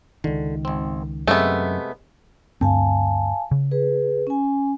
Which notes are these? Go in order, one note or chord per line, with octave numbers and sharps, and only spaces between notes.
C#2 D3 D#3
G#1 C4
F#2 C3 G#3 A3 B3 E5
D2 G2 C4 F5 G#5 A5
C#3
G#4 B4
C#4 G#5